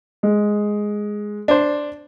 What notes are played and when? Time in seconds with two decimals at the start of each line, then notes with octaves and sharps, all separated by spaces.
0.23 G#3
1.48 D4 C5